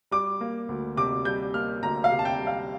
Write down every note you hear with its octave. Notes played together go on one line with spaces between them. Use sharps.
G3 D6
A#3
D2
C3 D6
G3 G6
A#3 F6
D2 A#5
F5
C3
A5
G5
G3
F5